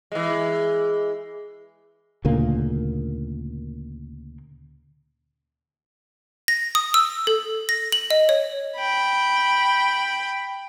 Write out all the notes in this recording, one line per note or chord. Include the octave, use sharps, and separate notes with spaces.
E3 G#3
D2 A#2 C#3 A#3
A#6
D#6
E6
A4
A#6
F#7
D#5
C#5
G5 B5